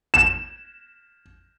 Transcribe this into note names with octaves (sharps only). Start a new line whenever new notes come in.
E7